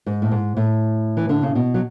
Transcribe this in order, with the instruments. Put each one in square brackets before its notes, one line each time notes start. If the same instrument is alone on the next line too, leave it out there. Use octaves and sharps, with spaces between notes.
[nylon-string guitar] G#2
A2
G#2
A2
E3
D3
C#3
B2
F#3